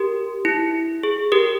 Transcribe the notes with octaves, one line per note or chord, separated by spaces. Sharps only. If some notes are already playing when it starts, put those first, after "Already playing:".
Already playing: G4 A#4
E4
G#4
G4 A#4